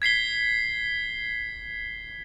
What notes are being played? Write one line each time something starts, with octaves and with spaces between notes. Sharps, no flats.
G#6 B6 C7 G7